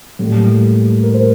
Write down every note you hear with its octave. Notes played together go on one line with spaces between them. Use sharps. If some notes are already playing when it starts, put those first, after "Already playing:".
A2 G3 A#3
A#4
C5